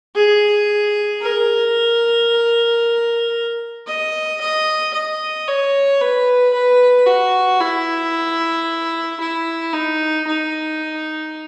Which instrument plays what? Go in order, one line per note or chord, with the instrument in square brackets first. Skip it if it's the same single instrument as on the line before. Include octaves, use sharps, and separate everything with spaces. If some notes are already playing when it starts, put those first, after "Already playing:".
[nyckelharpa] G#4
A#4
D#5
D#5
D#5
C#5
B4
B4
F#4
E4
E4
D#4
D#4